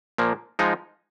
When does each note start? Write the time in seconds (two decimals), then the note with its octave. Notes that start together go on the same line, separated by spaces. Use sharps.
0.18 A#2 F3 A#3
0.59 F3 G#3 D#4